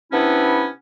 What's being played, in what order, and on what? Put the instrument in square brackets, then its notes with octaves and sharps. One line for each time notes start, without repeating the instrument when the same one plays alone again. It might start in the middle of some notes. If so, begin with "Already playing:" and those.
[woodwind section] C3 B3 C#4 D4 E4